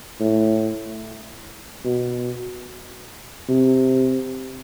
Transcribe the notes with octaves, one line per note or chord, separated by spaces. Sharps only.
A2
B2
C3